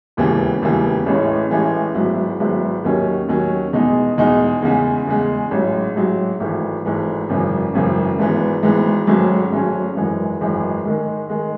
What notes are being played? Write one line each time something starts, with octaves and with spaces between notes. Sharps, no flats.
E1 D#2 C#3 E3
E1 D#2 C#3 E3
A1 A2 E3 G#3 C#4
A1 A2 E3 G#3 C#4
G#1 G#2 F#3 B3 E4
G#1 G#2 F#3 B3 E4
D#2 D#3 F#3 C#4
D#2 D#3 F#3 C#4
E2 B2 G#3 D#4
E2 B2 G#3 D#4
E2 C#3 G#3
E2 C#3 G#3
A1 G#2 F#3
A1 G#2 F#3
G#1 G#2 E3 A3
G#1 G#2 E3 A3
G#1 F#2 C#3 E3
G#1 F#2 C#3 E3
G#1 G#2 E3 B3
G#1 G#2 E3 B3
G#1 G#2 F#3 A3 C#4
G#1 G#2 F#3 A3 C#4
G#1 F#2 E3 G#3
G#1 F#2 E3 G#3
G#2 D#3 G#3
D#3 G#3